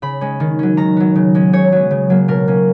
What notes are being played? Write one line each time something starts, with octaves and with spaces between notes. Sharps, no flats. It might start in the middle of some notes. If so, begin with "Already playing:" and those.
C#3 B5
G#3 C#4
D#3
F#3 C#4
D#3 A#5
F#3 B3
C#3
G#3 C#4
C#3 C#5
F#3 B3
C#3
F#3 A#3
B2 A#4
A#3 C#4